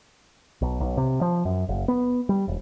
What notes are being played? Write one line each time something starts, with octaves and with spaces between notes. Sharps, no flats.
B1
B1
C3
F3
F#2
F#1
B3
G3
E1